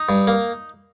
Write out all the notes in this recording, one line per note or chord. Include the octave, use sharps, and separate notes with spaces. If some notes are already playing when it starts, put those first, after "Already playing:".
Already playing: D#4
G2
A#3